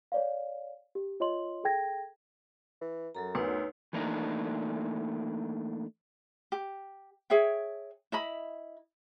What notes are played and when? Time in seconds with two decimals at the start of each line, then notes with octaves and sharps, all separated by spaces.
0.12 C#5 D5 F5
0.95 G4
1.20 F4 C#5 D#5 C6 F#7
1.64 G#4 A4 G5 G#6 A#6
2.81 E3
3.15 F#2 F#3 A4 A#5
3.35 D2 B3 D#4 B4 C#5
3.93 E3 A3 A#3 D4 D#4
6.52 G4
7.30 G#4 C#5 E5 G5
8.12 E4 D#5 B5